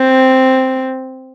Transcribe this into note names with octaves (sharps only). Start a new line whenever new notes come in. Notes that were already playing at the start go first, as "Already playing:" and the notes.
Already playing: C4